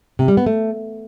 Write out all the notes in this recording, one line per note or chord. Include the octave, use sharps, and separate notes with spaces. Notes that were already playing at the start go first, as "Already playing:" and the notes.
C3
G3
B3
A3